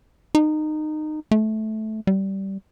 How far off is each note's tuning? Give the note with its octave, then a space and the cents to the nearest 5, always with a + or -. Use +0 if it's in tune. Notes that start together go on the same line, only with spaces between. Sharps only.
D#4 -20
A3 -15
G3 -15